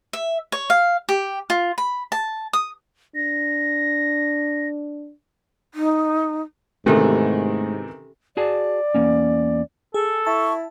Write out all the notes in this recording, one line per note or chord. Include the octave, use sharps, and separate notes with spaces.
E5
C#5
F5
G4
F4
B5
A5
D#6
D4 A#6
D#4
G#2 C3 D#3 E3 A3 C#4 G4 A4
F#4 G#4 D5 A5
E2 A#3 C#4
G#4 A4
E4 A5 C#6